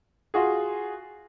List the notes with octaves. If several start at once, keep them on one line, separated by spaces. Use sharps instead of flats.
F4 F#4 G#4